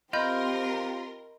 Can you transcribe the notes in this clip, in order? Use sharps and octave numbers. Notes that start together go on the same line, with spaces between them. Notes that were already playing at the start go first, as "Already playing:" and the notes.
C4 F4 G4 A#4 D#5 B5 C6 G6